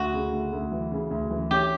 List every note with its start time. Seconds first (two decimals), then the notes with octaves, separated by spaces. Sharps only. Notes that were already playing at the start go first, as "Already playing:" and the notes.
Already playing: D2 F#4
0.13 C#3
0.33 D2
0.53 D2
0.72 E3
0.91 C#3
1.11 D2
1.30 E3
1.51 C#4 G4